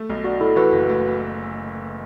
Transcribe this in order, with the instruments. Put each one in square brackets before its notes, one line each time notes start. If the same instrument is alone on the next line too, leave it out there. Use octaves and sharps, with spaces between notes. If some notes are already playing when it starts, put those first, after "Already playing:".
Already playing: [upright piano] A3
B1
[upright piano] D4 [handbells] F#4
[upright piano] A2 [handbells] E4 A4
[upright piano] E3 [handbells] F#4 B4
[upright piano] F#1
A3